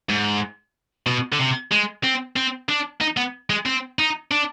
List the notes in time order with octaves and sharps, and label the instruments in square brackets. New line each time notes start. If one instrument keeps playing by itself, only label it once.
[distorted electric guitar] G#2
B2
D3
C3
G#3
C4
C4
D4
D#4
B3
G#3
C4
D#4
D4